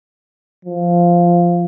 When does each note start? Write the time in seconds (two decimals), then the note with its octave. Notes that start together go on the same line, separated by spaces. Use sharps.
0.65 F3